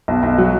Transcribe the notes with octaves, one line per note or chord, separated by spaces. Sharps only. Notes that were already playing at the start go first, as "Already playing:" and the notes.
B1
B1
F#3